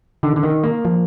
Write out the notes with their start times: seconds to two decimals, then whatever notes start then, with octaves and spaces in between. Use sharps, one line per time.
0.23 D3 D#3
0.36 D3
0.43 D#3
0.64 A#3
0.85 F3